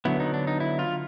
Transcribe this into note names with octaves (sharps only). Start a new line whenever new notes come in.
D3 F#3 B3 E4
D#4
D4
D#4
E4
F4